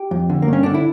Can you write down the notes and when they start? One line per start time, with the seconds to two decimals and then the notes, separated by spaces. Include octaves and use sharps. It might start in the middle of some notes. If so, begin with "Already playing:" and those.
Already playing: G4
0.11 F2
0.30 D3
0.42 A#3
0.48 G2 C#4
0.63 D3 D4
0.74 E4